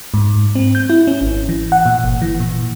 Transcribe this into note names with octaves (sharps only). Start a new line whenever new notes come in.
G#2
C4
G6
E4
C#4
G#1
E3
F#5
A#2
G1
E3
A#2